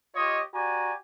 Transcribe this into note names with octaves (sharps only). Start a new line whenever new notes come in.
F4 G4 C#5 D#5
F#4 G4 D5 G#5 A#5